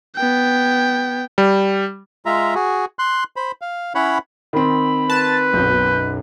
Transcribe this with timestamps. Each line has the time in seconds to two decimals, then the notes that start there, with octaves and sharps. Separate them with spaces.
0.16 B3 G5
1.38 G3
2.26 G#3 F4 E5 A#5
2.55 F#4 G#4
2.99 C6 F#6
3.36 C5 B5
3.62 F5
3.95 C#4 E4 C#5 F#5 B5
4.53 D#3 C4 B5
5.10 B4 A5
5.53 B1 F#2 G6